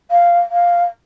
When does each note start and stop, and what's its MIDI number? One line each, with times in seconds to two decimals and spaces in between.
0.11 0.39 77
0.51 0.84 77